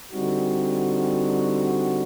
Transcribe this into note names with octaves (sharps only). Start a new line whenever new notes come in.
D3 G3 C4 D#4 F#4